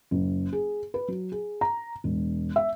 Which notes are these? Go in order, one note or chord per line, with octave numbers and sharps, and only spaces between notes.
F#1
G#4
B4
F#3
G#4
A#5
E1
E5